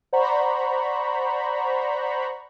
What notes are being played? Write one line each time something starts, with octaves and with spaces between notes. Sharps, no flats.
C5 D5 F#5 A#5 B5 C#6